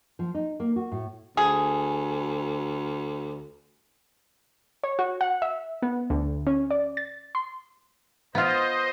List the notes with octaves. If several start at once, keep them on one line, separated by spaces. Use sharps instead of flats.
F3
D#4
A#3
F#4
A2
D2 G#4
C#5
F#4
F#5
E5
B3
D2
C#4
D5
A6
C6
B3 F4 C5 D#5